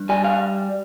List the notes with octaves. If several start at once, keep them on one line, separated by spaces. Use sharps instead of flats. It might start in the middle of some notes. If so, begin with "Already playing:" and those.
Already playing: G2
G3 G#5
F5